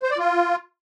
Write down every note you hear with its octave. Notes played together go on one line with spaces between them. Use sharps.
C5
D5
F4